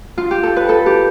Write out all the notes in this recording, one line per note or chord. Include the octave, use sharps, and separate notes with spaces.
F4
G4
A4
B4
A4
G4